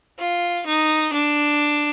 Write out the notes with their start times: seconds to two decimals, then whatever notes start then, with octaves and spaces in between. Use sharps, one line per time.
0.19 F4
0.67 D#4
1.14 D4